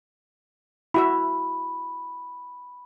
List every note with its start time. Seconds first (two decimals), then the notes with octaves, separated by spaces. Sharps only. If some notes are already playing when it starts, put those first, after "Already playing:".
0.94 E4 F#4 E5 B5